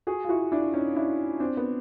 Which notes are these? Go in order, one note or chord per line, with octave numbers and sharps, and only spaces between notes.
F#4 G#4
F4
E4 F#4
D4 E4
C#4 D#4
D4 E4
C4 D4
B3